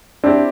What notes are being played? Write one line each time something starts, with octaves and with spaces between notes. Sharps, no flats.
C4 D4 E4 G4 D5